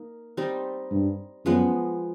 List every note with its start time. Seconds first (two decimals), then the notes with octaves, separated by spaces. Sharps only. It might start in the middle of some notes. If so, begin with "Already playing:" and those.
Already playing: A#3 D#4
0.37 G3 C4 D#4
0.91 G2
1.45 F#2 F3 G#3 B3